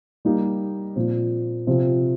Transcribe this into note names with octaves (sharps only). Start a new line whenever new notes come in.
G3 A#3 D#4
A#2 F3 C4
C3 F3 C4